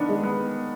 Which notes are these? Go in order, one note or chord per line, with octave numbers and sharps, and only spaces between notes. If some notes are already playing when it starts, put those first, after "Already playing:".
Already playing: D#3 B3 D4
G#3
B3